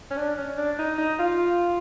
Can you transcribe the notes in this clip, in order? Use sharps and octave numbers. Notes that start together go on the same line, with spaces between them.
C#4
D4
C#4
D4
D#4
D#4
F4